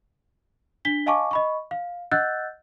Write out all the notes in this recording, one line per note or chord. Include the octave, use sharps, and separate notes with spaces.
D4 B6 G7
D#5 F5 G#5 A5 C#6 D6
D#5 B5 C#6
F5
D#5 F#5 E6 F#6 G6 A6